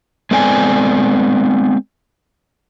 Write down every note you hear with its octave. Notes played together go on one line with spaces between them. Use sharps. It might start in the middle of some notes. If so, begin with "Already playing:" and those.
G#3 B3 C4 A4 D5 G#5